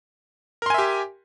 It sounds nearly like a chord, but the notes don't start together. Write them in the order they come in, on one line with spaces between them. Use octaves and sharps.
A#4 C6 G#5 E5 G4